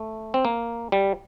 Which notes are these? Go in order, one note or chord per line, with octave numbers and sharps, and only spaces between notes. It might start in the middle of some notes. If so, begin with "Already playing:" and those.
Already playing: A3
C4
A#3
G3